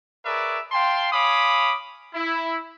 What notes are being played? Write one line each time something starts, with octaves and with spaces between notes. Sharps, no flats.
G#4 A#4 B4 C#5 D5 E5
F5 G5 A5 C6
C#5 F5 G#5 B5 D6 D#6
E4